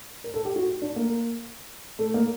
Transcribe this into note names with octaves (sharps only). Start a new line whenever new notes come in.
A#4
A4
G4
F#4
D4
A#3
A3
A#3